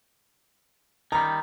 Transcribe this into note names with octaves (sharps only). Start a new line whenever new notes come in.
D#3 G3 A#5